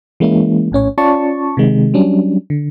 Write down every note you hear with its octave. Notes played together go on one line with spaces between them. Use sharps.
E3 G#3 A#3 C#4 E4
A#1 A2 C#4 C#5
C#4 F4 D5 A5 C#6
C3 D#3 G#3
F#3 G3 C#4 D4
D3